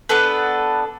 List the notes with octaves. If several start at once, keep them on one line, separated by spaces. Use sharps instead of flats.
B3 D4 A4 B4